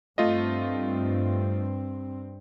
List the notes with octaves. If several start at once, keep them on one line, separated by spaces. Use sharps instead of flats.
G2 A3 C4 F4 D#5